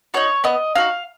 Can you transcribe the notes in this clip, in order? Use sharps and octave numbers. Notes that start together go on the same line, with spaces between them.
D#4 F#4 C#5
B3 D#5
D#4 F#4 F5